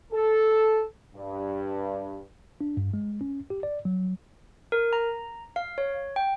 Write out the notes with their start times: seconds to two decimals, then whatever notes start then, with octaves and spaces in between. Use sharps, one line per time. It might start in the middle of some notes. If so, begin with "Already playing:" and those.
0.13 A4
1.15 G2
2.61 D4
2.77 G2
2.94 G#3
3.21 C#4
3.50 G4
3.63 D5
3.85 F#3
4.72 A#4
4.93 A#5
5.56 F5
5.78 C#5
6.16 G5